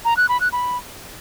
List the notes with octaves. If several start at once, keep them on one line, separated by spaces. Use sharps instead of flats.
A#5
F#6
B5
F#6
B5